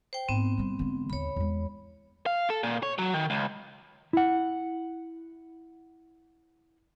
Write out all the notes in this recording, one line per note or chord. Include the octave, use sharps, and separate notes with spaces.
C5 G5
G#2 B3 C4
C3 G3
D3 G#3
D#2 D3 C#5 B5
E2 G#3
F5
A4
A#2
C#5
F#3
D#3
C#2
E4 F#5